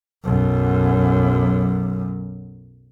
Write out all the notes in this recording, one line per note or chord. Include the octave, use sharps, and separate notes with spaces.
B1 F#2